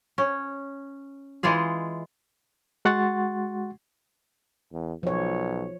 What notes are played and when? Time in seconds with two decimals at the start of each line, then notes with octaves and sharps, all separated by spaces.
0.18 C#4
1.43 E3 G#3 F4 G#4
2.85 G#3 F#4 F#5 C6 C#6 A6
4.72 E2
5.03 B1 F3 C#5